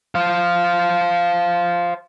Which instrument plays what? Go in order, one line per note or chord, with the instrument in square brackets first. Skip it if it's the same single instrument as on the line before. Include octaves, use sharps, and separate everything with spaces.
[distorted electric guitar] C5 F5